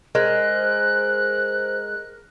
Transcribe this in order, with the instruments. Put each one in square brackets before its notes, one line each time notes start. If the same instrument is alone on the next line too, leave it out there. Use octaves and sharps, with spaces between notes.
[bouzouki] G#3 [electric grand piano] A#4 [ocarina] C5 [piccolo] F#6